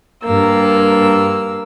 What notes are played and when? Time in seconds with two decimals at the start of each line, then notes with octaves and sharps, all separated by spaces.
0.24 G2 A#3 E6